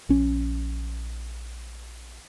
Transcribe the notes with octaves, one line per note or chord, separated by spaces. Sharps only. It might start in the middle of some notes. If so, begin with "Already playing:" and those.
A#1 C#4